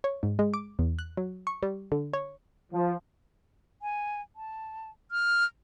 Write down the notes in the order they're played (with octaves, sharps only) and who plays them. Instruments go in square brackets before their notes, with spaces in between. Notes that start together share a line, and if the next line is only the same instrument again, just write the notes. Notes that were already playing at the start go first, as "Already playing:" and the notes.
[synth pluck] C#5
G#2
G#3
D6
E2
F#6
F#3
C#6
G3
D3
C#5
[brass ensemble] F3
[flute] G#5
A5
F6